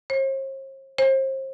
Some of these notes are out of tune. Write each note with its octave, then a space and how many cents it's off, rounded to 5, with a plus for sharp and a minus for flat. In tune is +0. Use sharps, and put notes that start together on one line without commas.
C5 +45
C5 +35